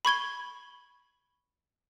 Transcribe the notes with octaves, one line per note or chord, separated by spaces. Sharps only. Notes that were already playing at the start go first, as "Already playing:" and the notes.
B5 C#6 G#6 G7